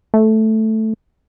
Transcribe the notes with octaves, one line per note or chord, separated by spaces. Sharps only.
A3